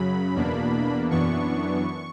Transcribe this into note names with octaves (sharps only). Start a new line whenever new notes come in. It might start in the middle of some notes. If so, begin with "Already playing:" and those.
Already playing: F#2 C#3 F#3 B5
E2 B2 A#3 D4
F#2 E3 B3 D4 C#6